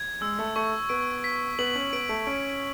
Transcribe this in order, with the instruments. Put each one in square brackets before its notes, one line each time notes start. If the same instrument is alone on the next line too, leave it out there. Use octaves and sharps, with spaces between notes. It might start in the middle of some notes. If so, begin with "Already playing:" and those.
Already playing: [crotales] G#6
[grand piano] G#3 [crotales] E6
[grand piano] A3
[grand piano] A3 [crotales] C#6
[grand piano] B3 [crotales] D7
[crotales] B6
[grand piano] B3 [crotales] F#7
[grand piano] C#4
[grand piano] B3 [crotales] D7
[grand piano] A3
[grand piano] C#4 [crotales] D7